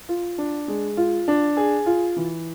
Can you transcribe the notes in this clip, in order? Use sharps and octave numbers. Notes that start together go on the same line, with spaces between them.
F4
D4
G#3
F4
D4
G#4
F4
E3